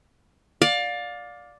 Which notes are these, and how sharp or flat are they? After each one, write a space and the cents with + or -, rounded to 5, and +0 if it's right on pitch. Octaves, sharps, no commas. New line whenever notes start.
D5 +0 F5 +25